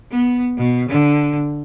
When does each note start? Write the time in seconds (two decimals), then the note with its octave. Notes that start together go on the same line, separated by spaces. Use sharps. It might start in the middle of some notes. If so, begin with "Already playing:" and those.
0.11 B3
0.57 B2
0.88 D3